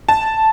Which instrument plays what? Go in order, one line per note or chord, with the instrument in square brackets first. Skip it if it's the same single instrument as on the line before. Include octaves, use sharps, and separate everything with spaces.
[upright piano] A5